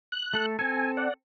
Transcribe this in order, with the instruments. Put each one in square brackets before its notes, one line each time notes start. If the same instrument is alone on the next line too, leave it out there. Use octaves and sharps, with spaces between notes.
[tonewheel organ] F#6
[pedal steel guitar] A3 A4
[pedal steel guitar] C4 A4 [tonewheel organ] G#5
[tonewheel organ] D5 F#5